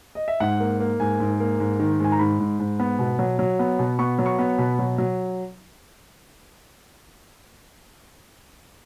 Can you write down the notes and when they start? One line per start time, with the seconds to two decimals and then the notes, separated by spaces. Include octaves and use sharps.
0.15 D#5
0.28 E5
0.40 G#2 F#5
0.60 A#3
0.80 A#3
1.00 G#2 G#5
1.20 G#2
1.40 A#3
1.60 G#2
1.80 D#3
2.00 G#2 G#5
2.12 A#5
2.19 G#2 B5
2.40 G#2
2.59 G#2
2.80 B3
2.99 B2
3.19 F#3
3.39 F#3
3.59 B3
3.79 B2
3.99 B3 C#6
4.19 F#3
4.26 C#6
4.39 B3
4.58 B2 B5
4.79 F#3
4.98 F#3